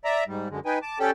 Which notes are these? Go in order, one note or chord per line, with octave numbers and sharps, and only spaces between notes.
D5 E5 A#5
G#2 G3
F#2 D3 G#3
D#4 B4 G5 G#5
A5 D6
C#4 G4 A4 D5 G5